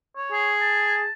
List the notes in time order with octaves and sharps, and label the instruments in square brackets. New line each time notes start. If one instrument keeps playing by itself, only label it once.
[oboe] C#5
[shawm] G#4
[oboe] A5